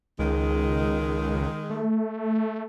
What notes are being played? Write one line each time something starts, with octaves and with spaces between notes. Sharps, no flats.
C#2 D#3 G#3
A3